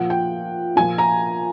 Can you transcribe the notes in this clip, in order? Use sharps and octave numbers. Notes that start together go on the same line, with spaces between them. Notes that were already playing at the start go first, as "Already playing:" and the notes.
Already playing: A#2 F3 F#5
G5
A#2 F3 G#5
A#5